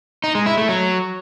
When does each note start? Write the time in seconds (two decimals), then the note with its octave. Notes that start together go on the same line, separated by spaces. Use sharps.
0.24 D#4
0.35 G#3
0.46 E4
0.57 A3
0.69 F#3